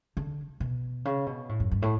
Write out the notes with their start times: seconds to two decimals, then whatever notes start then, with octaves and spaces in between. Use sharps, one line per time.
0.17 D3
0.60 B2
1.05 C#3
1.26 B2
1.49 A2
1.60 F#2
1.71 G2
1.82 A2